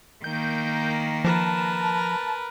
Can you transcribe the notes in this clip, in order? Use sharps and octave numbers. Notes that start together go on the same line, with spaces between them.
D#3 A#3 G6
F3 A#4 B4 A5